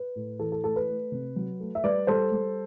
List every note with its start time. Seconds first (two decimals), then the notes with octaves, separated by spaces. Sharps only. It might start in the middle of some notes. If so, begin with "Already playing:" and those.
Already playing: B4
0.16 A2
0.39 E3 A4
0.52 A4
0.64 A3 A4
0.76 B4
0.88 A3
1.12 C3
1.36 F#3
1.60 A3
1.75 E5
1.84 G3 B4 D5
2.07 G3 A4 C5
2.32 G3